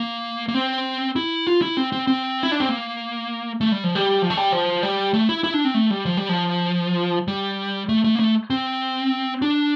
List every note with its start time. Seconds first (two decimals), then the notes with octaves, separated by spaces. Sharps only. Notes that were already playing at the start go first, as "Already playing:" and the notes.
Already playing: A#3
0.48 A#3
0.54 C4
1.16 E4
1.47 F4
1.62 E4
1.77 C4
1.92 C4
2.07 C4
2.43 E4
2.51 D4
2.60 C4
2.69 A#3
3.61 A3
3.72 G3
3.84 F3
3.95 G3
4.22 F3
4.30 A3
4.37 G3
4.52 F3
4.83 G3
5.14 A3
5.29 E4
5.44 E4
5.54 D4
5.65 C4
5.74 A3
5.90 G3
6.06 F3
6.17 G3
6.29 F3
7.28 G3
7.89 A3
8.04 A3
8.15 A#3
8.20 A3
8.50 C4
9.42 D4